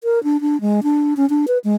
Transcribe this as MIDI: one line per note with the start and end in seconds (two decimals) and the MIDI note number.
0.04 0.22 70
0.24 0.40 62
0.41 0.60 62
0.61 0.80 56
0.83 1.14 62
1.17 1.28 61
1.30 1.46 62
1.48 1.58 71
1.64 1.75 56